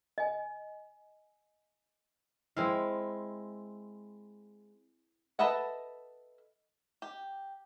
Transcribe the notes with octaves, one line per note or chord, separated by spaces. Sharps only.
D#5 G#5
G#3 C4 E4 F5
A4 B4 D#5 E5 F#5
G4